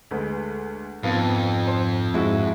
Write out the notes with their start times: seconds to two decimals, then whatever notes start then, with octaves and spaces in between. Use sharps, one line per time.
0.11 D2 G#3 B4
1.03 F2 G#2 B3 F5
1.67 C5
2.14 G#2 G#3 E4 F#4